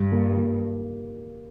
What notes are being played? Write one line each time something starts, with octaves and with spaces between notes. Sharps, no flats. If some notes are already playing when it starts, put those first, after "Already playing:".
Already playing: G2 G3
A#3
A#3